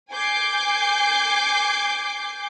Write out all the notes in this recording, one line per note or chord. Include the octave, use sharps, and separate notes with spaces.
G#5 D6 G6 C7